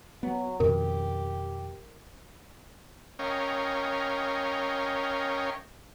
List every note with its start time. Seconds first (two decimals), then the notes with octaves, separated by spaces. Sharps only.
0.23 F#3 B3
0.60 F2 B2 D#3 G4 A#4
3.19 C#4 A#4 C#5 D#5 F5 G5